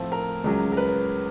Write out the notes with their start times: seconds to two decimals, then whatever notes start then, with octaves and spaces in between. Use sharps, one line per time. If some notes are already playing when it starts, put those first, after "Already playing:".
Already playing: A2 F3 A3 C4 A4
0.12 A#4
0.44 C#2 C#3 F#3
0.72 A#4
0.77 B4